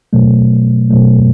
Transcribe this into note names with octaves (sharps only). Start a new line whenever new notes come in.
B2 F#3 A3
B2 F#3 A3